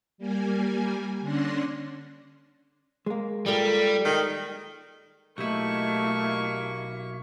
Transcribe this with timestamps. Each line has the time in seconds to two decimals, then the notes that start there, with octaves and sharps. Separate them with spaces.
0.18 G3 A#3 G#5
1.21 D3 C#4 D4 C6 A#6
3.06 G#3 A#3
3.46 G3 F4 A4 A#4
4.05 D#3 G4
5.38 B1 A3 A#3 E4 G4 D#5 C#6